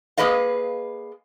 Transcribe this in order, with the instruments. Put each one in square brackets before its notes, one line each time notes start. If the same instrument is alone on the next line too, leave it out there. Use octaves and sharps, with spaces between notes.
[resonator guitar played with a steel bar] A#3 G#4 B4 D#5 F5